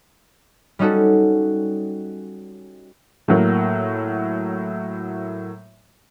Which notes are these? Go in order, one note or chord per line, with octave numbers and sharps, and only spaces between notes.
G3 C#4 D#4 F#4 A4
A2 F#3 A#3